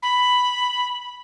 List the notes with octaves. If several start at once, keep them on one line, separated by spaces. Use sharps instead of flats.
B5